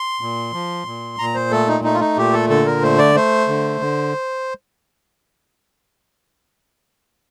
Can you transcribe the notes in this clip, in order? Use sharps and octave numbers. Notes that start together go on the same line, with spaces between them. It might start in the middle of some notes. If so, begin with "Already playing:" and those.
Already playing: C6
A#2
F3
A#2
A#2 A#5
C5
A3 A4
D#4
A3 D#4
F4
D#4
A#2 G4
A4
D3 A4
A#4
A3 C5
D5
A3 C5
D3
D3